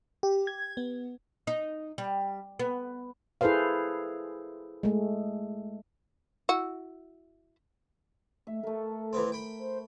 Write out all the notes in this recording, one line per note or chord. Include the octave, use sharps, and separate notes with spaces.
G4
G#6
B3
D#4
G3
B3
E4 G#4 A4 B4 C5 F5
G#3 A3
E4 F#4
A3 E5
A3 A4 A#4
E3 B3 C4
G5 B5
C5